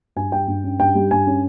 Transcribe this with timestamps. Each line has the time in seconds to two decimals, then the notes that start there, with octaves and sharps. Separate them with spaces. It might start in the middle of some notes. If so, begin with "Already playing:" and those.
0.16 G2 G#5
0.32 G3 G5
0.48 G2
0.64 C#4
0.80 G2 G5
0.95 G3
1.11 G2 G#5
1.27 C#4